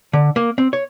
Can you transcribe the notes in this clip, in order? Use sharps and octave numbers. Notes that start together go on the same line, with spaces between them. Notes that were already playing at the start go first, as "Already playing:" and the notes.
D3
A#3
C4
C#5